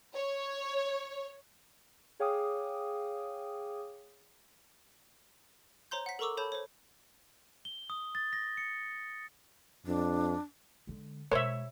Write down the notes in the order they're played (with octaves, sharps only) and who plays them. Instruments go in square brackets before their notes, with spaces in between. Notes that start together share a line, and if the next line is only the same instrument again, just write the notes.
[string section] C#5
[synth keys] G#4 C#5 F5 G5 D6 D#6
[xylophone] C5 C#5 A#5 C6 G6
F#5 B6
A4 A#4 A#5 C#6 D6 E6
A4 C#5 A5 B5 G6 F7
C5 C#5
[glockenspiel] G7
D#6
A6
A#6
C#7
[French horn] F2 [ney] D4
[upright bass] D3 G#3
[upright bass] B2 G#3 [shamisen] A#4 C5 [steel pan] C#5 E5